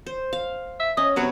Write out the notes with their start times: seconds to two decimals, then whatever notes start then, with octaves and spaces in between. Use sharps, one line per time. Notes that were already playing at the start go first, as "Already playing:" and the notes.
0.06 C5
0.33 F5
0.80 E5
0.97 C#4 D#5
1.16 C3 F#3 B3 C#5